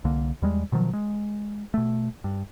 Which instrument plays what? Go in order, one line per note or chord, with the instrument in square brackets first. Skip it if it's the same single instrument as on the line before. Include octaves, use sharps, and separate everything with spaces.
[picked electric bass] C2 D3 A#3
E2 G3 G#3
B2 D#3 F3 F#3
G#3
B2 A3
G2